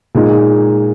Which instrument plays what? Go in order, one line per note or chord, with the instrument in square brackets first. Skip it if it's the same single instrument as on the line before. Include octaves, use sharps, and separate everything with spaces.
[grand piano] A#2 G#3 D#4